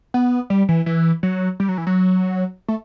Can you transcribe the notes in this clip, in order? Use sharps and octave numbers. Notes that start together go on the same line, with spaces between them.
B3
G3
E3
E3
F#3
G3
F#3
E3
F#3
A3